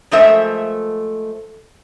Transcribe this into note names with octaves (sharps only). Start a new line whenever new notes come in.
F3 G#3 A3 A#4 C5 E5